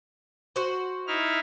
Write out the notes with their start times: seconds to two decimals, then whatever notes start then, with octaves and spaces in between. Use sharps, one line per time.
0.56 F#4 C5
1.07 D#4 E4 F6